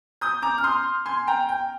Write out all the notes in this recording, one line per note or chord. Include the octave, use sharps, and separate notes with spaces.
D#6 G6
A#5 D6
F6
C6 D#6
G#5 C6
G5 A#5
G5